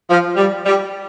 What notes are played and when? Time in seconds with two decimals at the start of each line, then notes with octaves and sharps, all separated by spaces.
0.08 F3
0.36 G3
0.65 G3